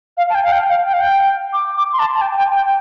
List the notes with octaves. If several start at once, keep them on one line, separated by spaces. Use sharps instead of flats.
F5
A5
G5
F5
G5
F5
G5
F5
G5
D6
D6
C6
A5
A5
G5
G5
G5